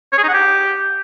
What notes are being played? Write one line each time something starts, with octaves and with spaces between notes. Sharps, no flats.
C#5
G#4
D#4
F#5
G4